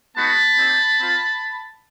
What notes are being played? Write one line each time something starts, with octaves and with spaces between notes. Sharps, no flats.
G#3 B3 D#4 F#4 A5 B5
C4 D#4 G4
C4 F4